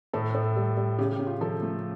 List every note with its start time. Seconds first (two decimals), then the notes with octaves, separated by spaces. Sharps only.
0.13 A2 A4
0.35 A2
0.56 G3
0.77 G3
0.98 C#3 G4
1.12 G4
1.19 C#3
1.27 F4
1.41 F3 A4
1.62 A3